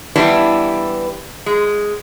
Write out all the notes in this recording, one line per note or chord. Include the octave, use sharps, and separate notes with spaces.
E3 G3 B3 D4 E4
G#3